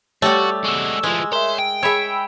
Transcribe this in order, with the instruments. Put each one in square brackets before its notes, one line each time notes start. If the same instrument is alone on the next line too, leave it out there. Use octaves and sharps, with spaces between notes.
[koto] G3 A3 [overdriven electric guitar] F#4 [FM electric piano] G4 C#5
[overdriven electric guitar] G#3 F#4 [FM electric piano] C#6 E6
[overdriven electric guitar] E3 F3 [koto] G#3
[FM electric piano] A#4 E5 [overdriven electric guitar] C#5 C6
[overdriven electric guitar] G5
[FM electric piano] G#4 B5 E6 [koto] C#5 E5